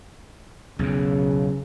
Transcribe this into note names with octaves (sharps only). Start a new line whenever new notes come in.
B1 E2 C#3